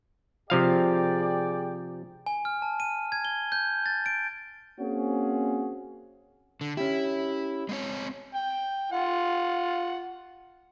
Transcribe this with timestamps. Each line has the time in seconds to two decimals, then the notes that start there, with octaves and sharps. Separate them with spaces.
0.50 C3 F3 G#4 D5 F5 G5
2.26 G#5
2.45 F6
2.62 A5
2.80 D#7
3.12 G#6
3.25 G7
3.52 G6
3.86 A6
4.06 D7
4.79 A#3 C4 C#4 F#4 G#4
6.61 D3
6.77 C#4 E4 G4
7.69 G#3 C4 C#5
8.35 G5
8.92 F4 F#5